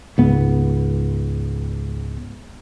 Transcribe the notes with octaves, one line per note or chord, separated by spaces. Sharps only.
C#2 G#2 B3